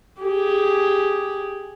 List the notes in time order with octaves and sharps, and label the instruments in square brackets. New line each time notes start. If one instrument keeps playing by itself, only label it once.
[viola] G4 G#4